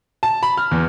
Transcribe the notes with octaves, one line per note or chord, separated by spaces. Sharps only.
A5
B5
F6
E2